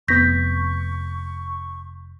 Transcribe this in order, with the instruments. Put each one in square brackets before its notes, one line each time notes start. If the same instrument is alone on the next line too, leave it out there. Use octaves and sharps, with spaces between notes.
[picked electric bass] F1 B3 [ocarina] C#6 [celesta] G6 A#6 B6